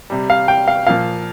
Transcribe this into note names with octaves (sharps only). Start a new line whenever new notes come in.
C3 G3
F5
G5
F5
A#2 F3 F5